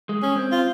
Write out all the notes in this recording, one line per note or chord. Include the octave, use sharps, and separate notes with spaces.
G#3
C#4
C4
F4